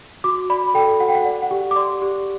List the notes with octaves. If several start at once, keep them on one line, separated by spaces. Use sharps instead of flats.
F#4 D6
D5 B5
A4 G5
F#4 F#5
G5
F#5
D5
F#5
G4
D6
D5 C6
G4